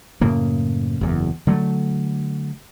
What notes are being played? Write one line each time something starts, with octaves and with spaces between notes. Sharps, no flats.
F#2 A2 C#3 A#3
F#1 E2
D3 F#3 A3